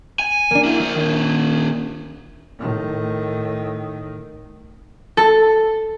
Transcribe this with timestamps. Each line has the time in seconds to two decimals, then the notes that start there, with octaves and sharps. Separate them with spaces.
0.19 G#5
0.51 A#3 D4
0.64 E4 F#4
0.79 F3 A#4
0.95 A#2 D#3
2.59 A2 D#3
5.17 A4